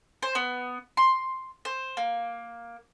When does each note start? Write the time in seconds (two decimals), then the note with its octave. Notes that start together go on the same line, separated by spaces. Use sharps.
0.22 C5
0.35 B3
0.97 C6
1.65 C5
1.97 A#3